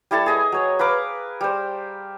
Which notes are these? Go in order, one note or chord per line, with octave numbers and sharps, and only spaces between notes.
G3 E4 A4 A5
G#4 D#5 G#5
F#3 C#5
B4 F5 A#5 D6
G3 C5